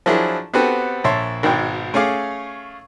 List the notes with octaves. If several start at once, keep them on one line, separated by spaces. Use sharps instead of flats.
F3 F#3 D4 E4 G#4
B3 C4 F#4 G4 A4 B4
A#1 C#5 E5 A5 C6
G#1 G#2 B2 G5
A3 C#4 G#4 F5 D6